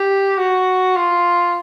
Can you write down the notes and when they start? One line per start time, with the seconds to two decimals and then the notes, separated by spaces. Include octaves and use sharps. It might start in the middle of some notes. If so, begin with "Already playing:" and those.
Already playing: G4
0.38 F#4
0.96 F4